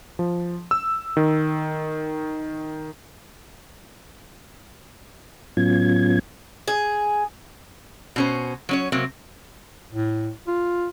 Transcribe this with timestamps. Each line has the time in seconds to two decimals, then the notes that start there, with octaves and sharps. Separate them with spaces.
0.19 F3
0.71 E6
1.17 D#3
5.57 A2 F#3 B3 C#4 F4 G#6
6.68 G#4
8.16 B2 C#4 C5
8.69 F#3 C#4 C#5
8.92 C3 F#3 A#3 C4
9.92 A2
10.47 F4